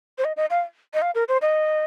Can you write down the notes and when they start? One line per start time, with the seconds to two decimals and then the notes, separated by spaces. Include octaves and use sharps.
0.18 C5
0.24 D#5
0.37 D#5
0.50 F5
0.94 D#5
1.02 F5
1.15 A#4
1.28 C5
1.42 D#5